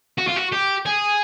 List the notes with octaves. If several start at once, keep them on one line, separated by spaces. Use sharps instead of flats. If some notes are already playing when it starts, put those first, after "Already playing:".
F#4
F4
F#4
G4
G#4